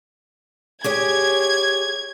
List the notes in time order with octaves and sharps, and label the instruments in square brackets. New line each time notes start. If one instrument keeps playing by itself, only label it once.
[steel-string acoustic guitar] G4 G#4 C#5 [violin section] G#6